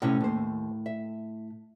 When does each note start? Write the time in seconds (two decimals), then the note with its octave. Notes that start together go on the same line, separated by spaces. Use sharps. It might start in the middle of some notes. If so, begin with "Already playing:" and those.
0.02 A2 C3 C#4 E4
0.21 D#2 C5
0.86 E5